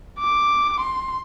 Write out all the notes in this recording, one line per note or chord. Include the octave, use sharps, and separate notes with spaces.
D6
C6